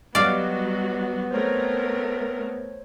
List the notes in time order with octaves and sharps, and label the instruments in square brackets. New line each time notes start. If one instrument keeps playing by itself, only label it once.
[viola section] F#3 G3 F#4 [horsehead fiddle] B3 [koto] D5 F5 [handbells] D#5
[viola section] A3 C4 A#4 [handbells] C5 C#5